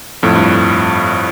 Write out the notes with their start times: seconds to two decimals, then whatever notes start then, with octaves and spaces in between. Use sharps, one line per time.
0.23 F2 A2
0.35 G2